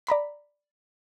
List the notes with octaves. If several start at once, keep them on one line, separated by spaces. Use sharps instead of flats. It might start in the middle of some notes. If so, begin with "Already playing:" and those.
D5 A#5 B5 B6